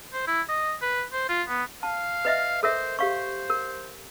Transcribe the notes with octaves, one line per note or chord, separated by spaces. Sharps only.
C5
E4
D#5
B4
C5
F4
B3
F5 A5
B4 D#5 E5
A4 A#4 C5 E5
G4 C5 F5 C#6
A#4